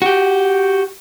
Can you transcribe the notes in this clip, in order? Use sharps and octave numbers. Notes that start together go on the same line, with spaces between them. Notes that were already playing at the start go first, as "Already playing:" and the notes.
F#4 G4